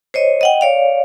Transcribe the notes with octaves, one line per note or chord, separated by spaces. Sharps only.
C5 C#5 D#5
D#5 F#5 G5
C#5 D5 F5